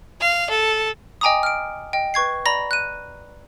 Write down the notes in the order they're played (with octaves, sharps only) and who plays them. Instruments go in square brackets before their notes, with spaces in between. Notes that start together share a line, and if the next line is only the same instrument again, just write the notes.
[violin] F5
A4
[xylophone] D#5 G5 G#5 A#5 D6 D#6
F6 D7
D#5 G5
B4 C#6 G#6 C7
D5 A#5 B5 A#6
F#6 D#7